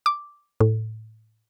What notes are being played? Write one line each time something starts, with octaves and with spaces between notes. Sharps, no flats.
D6
A2